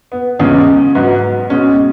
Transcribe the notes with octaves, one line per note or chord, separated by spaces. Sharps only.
B3
E2 C#3 G#3 C#4
G#2 F#3 B3
B2 G#3 C#4